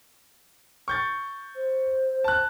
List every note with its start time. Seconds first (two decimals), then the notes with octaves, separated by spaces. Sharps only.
0.88 C#6 G6 A6
1.56 C5
2.24 A5 F#6